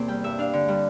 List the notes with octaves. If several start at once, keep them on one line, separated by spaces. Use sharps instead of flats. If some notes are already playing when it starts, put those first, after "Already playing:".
Already playing: E2 C3 A#3
G3 G5
G2 E5
D4 F5
D3
G3